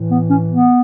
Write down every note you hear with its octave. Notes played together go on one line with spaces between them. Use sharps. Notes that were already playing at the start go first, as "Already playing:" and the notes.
Already playing: A2 E3
B3
C#4
B3